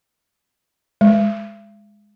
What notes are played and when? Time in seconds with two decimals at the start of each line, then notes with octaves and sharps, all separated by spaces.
1.01 G#3